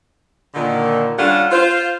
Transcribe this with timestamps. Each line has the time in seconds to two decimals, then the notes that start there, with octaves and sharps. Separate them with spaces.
0.54 A#2 D3 D#3
1.19 G3 C#4 D4 F4 A4 F#5
1.51 F4 C5